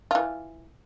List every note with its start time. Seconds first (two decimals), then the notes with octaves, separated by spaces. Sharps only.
0.11 E3 F4